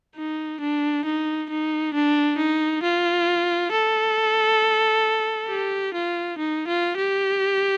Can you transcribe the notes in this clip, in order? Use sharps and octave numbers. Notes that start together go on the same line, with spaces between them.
D#4
D4
D#4
D#4
D4
D#4
F4
A4
G4
F4
D#4
F4
G4